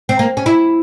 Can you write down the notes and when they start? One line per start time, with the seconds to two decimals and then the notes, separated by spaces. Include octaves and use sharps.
0.09 C4
0.19 A#3
0.37 C#4
0.46 E4